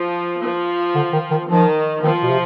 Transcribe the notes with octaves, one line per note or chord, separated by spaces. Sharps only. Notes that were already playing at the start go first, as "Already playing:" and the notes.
Already playing: F3
F3
D3
D#3
D#3
D#3 F3
D#3 F3
B2
C3